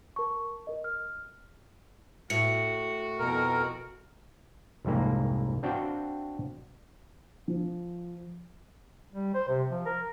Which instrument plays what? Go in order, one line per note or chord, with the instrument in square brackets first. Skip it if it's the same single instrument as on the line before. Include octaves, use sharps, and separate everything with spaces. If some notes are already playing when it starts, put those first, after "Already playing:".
[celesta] A#4 A5 C#6
A#4 D#5
F6
[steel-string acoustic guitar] A2 [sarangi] F#4 [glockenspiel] C#7
[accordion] F2 B2 A#4
[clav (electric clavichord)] C2 F2 G#2 A#3
C4 D4 F#4 F5 G5
[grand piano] F3
[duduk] G3
C5
C3
F3
A#4